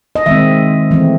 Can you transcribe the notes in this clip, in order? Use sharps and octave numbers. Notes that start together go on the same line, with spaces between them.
D#5
D#3 G#3 C4 E5
E3 A3 C4